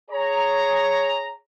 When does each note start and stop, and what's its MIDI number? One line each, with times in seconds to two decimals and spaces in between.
0.10 1.36 68
0.10 1.36 73
0.10 1.36 82